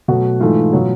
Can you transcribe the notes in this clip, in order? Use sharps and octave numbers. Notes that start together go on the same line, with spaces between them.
B2 F#3 A3 F#4 F#5
G#2 E3 A3 F4 F5
B2 F#3